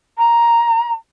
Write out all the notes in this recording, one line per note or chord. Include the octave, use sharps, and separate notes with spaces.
A#5